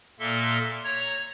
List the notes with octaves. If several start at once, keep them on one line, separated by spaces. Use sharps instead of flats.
A#2 A#3 A4 E5 C6
C#5 A#5 G#6